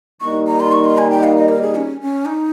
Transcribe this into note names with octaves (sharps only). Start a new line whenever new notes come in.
D#3 G3 A#3 D#4 C#6
A#5
C6
C#6
C6
G#5
G5
F5
D#5
A#4
G#4
C#4
C#4
D#4